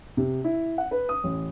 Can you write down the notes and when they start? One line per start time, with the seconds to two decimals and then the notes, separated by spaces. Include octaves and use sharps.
0.17 C3
0.44 E4
0.78 F#5
0.91 B4
1.09 D#6
1.24 A1